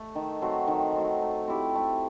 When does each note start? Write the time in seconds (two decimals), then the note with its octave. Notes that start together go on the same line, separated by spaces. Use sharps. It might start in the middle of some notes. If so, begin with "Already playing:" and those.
Already playing: A3
0.15 D#3
0.42 F#3 A3 C4
0.67 D#3
0.95 F#3 A3 C4
1.22 A3
1.48 C4 E4 G4
1.75 A3